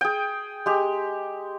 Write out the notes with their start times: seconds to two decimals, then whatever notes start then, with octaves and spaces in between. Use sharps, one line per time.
0.01 G#4 G5
0.66 G#3 G4